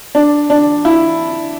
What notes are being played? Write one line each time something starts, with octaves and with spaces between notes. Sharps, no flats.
D4
D4
E4